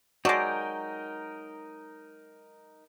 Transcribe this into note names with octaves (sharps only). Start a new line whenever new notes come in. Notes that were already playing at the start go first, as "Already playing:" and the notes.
F#3 G#3 D#4 F#4 A#4 D5 G5 A5